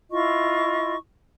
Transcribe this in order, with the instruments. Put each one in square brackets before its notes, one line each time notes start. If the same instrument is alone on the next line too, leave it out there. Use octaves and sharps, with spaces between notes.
[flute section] E4 F4 D#5 C#6